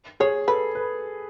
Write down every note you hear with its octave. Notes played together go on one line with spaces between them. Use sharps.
G#4 C#5
A4 B4
B4